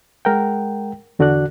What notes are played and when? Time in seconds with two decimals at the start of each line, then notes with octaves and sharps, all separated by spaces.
0.25 G#3 A#4 F#5 G5
1.19 E2 D3 F#4 A4 D5 F#6